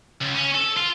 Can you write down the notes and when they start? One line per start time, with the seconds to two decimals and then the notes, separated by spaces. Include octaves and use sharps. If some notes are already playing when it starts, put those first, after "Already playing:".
0.21 C#2
0.35 C#4
0.54 A4
0.76 F4